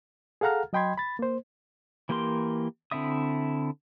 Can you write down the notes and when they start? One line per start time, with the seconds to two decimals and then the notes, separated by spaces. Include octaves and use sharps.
0.41 G#4 A4 F5 F#5 A#5 F6
0.73 F#3 D#5 G5 B5 C6 G#6
0.98 B5 A6
1.19 A#3 C5
2.09 E3 A#3 G4 A#4 C6
2.91 D3 C4 E4 E5 D#6